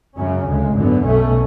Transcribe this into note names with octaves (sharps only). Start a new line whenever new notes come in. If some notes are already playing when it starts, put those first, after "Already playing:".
F#2 C#3 F#3 C#4
D2 C#3 G#3
G#1 F#2 D3 F#3 B3
B1 B2 A3 C#4